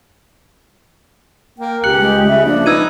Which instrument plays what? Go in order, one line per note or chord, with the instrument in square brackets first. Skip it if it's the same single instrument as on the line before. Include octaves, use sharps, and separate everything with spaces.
[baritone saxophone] A#3 [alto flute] G5
[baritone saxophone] C#2 [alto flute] G4 [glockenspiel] F#6 C#7 F#7
[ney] G#3
[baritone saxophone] C#3 [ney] E5
[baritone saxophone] F3 [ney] A#3 [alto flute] D4
[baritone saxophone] D#4 [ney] B4 [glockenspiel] E6 G#6 D#7